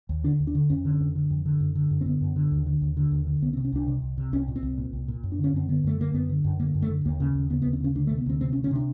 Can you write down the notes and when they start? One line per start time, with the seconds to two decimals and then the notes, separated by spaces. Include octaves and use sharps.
0.09 D#2
0.24 D3 D4
0.40 D#2
0.47 D4
0.55 D3
0.70 F2 C#4
0.85 D3
1.00 F2
1.15 D3
1.30 F2
1.45 D3
1.60 F#2
1.75 D3
1.91 F#2
2.01 C4
2.06 D3 B3
2.21 F#2
2.36 D3
2.51 D#2
2.66 D3
2.82 D#2
2.97 D3
3.11 D#2
3.27 D3
3.42 C2 B3
3.53 C4
3.57 C3
3.65 C#4
3.72 C2 D4
3.88 C3
4.02 C2
4.17 C3
4.32 C2 C#4
4.48 A#2
4.56 C4
4.63 C2
4.78 A#2
4.93 C2
5.08 A#2
5.23 F#2
5.32 D4
5.39 D3
5.44 C#4
5.53 F#2 C4
5.68 D3 B3
5.84 F#2 A3
5.99 D3 A#3
6.14 F#2 B3
6.30 D3
6.44 F#2
6.59 D3 A#3
6.75 F#2
6.82 A3
6.90 D3
7.05 D#2 A#3
7.20 C#3
7.35 D#2
7.50 C#3 B3
7.62 B3
7.66 D#2
7.73 C4
7.80 C#3 C#4
7.95 D2 D4
8.07 A3
8.11 C3
8.18 B3
8.26 D2 C4
8.41 C3 C4
8.52 C#4
8.56 D2
8.64 C#4
8.71 C3 D4